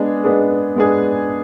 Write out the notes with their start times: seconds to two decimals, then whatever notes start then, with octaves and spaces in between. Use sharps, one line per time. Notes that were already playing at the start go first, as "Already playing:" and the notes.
Already playing: G#3 B3 D4 G#4
0.24 G#3 B3 D4 G#4
0.76 G#3 B3 D4 G#4